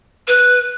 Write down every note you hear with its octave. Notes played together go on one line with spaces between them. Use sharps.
B4